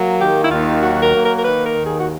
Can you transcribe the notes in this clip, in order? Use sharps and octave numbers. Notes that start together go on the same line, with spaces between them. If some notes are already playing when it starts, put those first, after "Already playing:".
Already playing: F#3 A#3
D#3 G4
E4
D#2 F4
F#3 F#4
A#4
A#3
A#4
A#4
D#3 B4
A#4
D#2
G#4
F#4